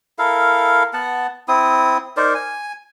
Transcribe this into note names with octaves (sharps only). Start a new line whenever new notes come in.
E4 A4 A#4 F5
B3 F#5 A5
C4 E4 D#6
D#4 A#4 C5 D5
G#5